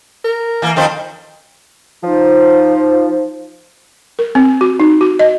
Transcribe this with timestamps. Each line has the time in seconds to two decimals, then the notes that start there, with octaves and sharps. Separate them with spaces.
0.24 A#4
0.62 E3 A#3
0.76 F2 D#3 C5
2.03 F3 D#4
4.19 A#4
4.35 C4
4.61 F#4
4.80 D#4
5.01 F#4
5.19 D#5